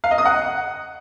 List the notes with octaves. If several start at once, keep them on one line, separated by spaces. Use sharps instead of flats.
F5
D#5
D#6
F#5